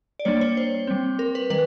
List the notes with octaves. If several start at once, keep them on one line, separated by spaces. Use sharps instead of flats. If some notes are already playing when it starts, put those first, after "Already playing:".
D5
G3 A#3 D4 C#5
C#5
C5
G3 C4
A#4
B4
D#3 G3 B4